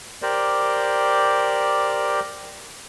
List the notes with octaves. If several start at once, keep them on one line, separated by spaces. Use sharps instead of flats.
G4 A#4 C5 D5